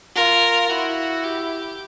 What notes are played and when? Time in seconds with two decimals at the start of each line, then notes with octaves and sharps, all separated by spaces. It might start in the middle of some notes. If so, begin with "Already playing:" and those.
0.15 F4 A#4
0.69 E4 F#4
1.23 G4